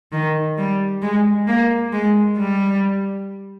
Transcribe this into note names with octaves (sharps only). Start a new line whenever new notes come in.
D#3
G3
G#3
A#3
G#3
G3